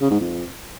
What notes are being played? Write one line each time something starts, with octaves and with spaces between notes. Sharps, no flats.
C#3
G#2
F2